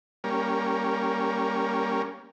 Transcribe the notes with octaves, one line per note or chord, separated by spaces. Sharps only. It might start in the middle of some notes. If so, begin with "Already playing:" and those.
G3 A#3 C#4